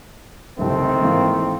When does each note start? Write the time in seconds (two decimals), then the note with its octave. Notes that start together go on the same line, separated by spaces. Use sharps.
0.59 F#1 C2 D#3 A3 C4
1.01 G#2 E3 A#3